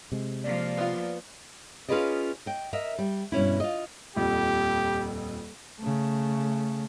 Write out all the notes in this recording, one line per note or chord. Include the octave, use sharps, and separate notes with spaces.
C3 G#3
F3 A#3 D5
B3 F4
C#4 F4 G#4 B4 D5 D#5
D#5 G5
A#4 D#5 E5
G3
G2 B2 C#4 E4
F4 D#5
D#1 F2 G4
C#3 A3